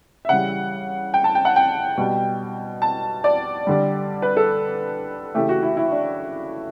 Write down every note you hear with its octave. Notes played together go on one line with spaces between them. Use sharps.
E5
C#3 E3 G3 F#5
G5
A5
G5
F#5
G5
B2 G3
A5
D5
D3 G3
B4
A4
C#3 E3 A3 G4
F#4
E4
E4
D4